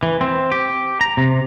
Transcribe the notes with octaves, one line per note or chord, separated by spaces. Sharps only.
E3
C4
G4
A#5
C3